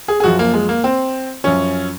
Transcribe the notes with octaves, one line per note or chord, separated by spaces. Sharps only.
G#4
G#4
F#2 F3 F#4
A#3
G#3
A#3
C4
F#2 F3 C#4